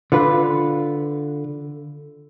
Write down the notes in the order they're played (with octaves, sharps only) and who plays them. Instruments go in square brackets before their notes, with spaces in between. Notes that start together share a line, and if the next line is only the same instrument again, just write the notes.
[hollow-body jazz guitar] D3 F4 B4